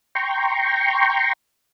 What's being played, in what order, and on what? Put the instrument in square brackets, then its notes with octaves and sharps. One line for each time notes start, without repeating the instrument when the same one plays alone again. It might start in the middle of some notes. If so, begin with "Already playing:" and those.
[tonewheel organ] G5 A#5 C6 C#6